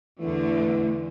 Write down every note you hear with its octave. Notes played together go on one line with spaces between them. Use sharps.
E2 D3 E3 A3